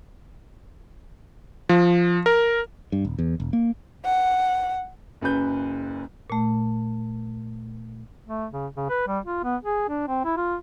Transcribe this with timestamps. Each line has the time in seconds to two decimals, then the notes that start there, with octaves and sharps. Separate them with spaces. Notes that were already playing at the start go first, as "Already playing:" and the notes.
1.69 F3
2.26 A#4
2.92 G2
3.05 D#1
3.19 E2
3.40 E1
3.53 A#3
4.05 F#5
5.21 F#1 F#2 C#3 B4 G6
6.30 A#2 A3
8.26 A3
8.51 C#3
8.76 C#3
8.90 B4
9.07 G3
9.25 F4
9.44 B3
9.63 G#4
9.89 D4
10.07 C4
10.25 E4
10.37 F4